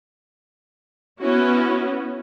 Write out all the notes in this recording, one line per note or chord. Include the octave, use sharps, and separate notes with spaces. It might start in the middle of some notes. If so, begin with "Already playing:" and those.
B3 C#4 E4 F#4